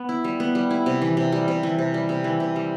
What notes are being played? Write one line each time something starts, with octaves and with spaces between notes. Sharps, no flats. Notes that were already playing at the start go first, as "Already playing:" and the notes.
Already playing: B3
E4
G3
B3
G3
E4
C3
E3
C3
G3
C3
E3
C3
G3
C3
E3
C3
G3